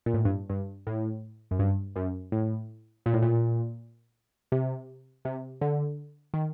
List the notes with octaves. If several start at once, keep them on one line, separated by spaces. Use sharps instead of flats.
A#2
A2
G2
G2
A2
F#2
G2
F#2
A2
A#2
A2
A#2
C3
C3
D3
D#3